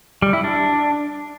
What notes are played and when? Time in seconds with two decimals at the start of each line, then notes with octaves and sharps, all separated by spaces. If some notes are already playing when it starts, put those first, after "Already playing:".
0.22 G3
0.33 E4
0.44 D4